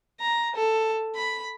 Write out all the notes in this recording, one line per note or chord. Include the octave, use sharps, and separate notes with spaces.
A#5
A4
B5